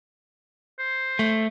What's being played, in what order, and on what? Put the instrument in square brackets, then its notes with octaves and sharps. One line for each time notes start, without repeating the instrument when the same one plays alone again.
[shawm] C5
[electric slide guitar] A3